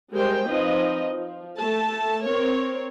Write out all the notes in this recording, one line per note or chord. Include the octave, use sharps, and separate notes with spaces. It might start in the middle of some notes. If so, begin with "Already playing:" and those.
G3 G#3 G4 A#4 C5 G5
F3 C4 D#4 B4 D#5
F3
A3 A4 A5
C4 A#4 C#5